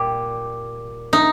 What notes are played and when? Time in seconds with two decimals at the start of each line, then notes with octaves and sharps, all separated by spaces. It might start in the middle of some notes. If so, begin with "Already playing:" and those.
Already playing: A#2 G3 G4
1.13 D#4